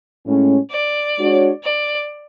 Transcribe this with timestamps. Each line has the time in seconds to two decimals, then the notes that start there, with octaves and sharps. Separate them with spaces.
0.25 A2 G#3 C#4
0.71 D5
1.18 G#3 D4 F#4 C#5
1.64 D5